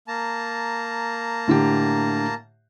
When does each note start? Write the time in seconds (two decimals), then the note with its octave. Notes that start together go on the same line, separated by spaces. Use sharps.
0.08 A#3 A5 A#5
1.48 A2 D3 G4